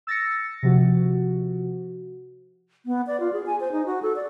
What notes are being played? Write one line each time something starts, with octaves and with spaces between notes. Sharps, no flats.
E6 A6 A#6 C#7
C3 F3 F#4
B3
D5
F4
G#4
G#5
C5
D#4
F#4
A4
D5